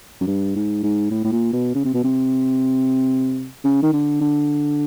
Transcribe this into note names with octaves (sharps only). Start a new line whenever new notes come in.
F#2
G2
G#2
G#2
A2
A2
A#2
B2
C#3
C3
B2
C3
C#3
D#3
D3
D3